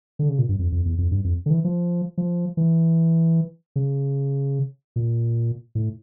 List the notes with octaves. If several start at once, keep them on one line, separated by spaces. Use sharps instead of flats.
D3
C#3
A#2
G2
F2
F2
E2
F2
G2
F2
D3
E3
F3
F3
E3
C#3
A#2
A2